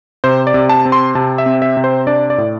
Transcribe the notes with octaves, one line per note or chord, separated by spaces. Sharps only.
C3 C5
D5
C3
A5
C4
C6
C3 A5
E5
C4
E5
C3
C5
D4 D5
D5
A2